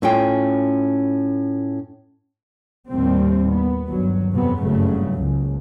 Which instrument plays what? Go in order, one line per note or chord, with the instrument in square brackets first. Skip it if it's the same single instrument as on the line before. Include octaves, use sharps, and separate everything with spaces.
[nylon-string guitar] A2 C#4 F4 G5
[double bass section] D#2 A2 G3 C4
B3
G1 D#2 F#3
F2 C3 F#3 B3
F#1 G2 C#3 F#3 A3
F#1 C#2